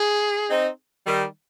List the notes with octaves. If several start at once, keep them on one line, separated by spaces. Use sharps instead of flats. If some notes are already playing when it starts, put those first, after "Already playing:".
Already playing: G#4
C4 D#4
D#3 G3